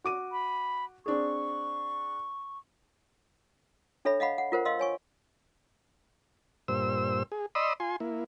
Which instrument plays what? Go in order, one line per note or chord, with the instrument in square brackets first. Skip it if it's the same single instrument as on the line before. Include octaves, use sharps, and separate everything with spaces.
[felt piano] F#4 D6 D#7
[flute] B5
[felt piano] C4 D4 G#4 [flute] C#6
[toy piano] D4 A4 C#5 E5 B5
D#5 F5 F#5 B5
F#5
F4 A#4 C5 F#5
D#5 F5 C6 E6
C#5 G#5 C#6
[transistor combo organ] G2 A#2 C5 E6
G#4
D5 D#5 B5 C6 D#6 E6
F4 G#5 C6
A#3 E4